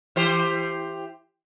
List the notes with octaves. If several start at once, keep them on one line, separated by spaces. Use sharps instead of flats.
E3 G4 C5